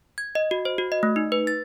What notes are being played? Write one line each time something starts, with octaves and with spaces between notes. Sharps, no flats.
G#6
D#5
F#4
C5
F#4
D#5
A3
D#4
B4
A6